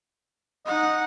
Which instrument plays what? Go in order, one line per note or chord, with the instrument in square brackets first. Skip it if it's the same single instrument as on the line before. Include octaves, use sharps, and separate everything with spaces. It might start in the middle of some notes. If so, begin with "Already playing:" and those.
[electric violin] D#4 F#5 [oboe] D#5